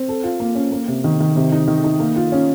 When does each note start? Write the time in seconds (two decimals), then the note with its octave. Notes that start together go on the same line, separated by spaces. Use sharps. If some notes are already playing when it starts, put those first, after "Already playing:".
Already playing: C4
0.09 A4
0.24 F4
0.40 A#3
0.55 C#4
0.72 A#3
0.88 C3
1.04 D#3
1.20 D#3
1.36 C3
1.52 D#4
1.68 D#3
1.84 D#4
2.00 A#3
2.16 F4
2.32 C#4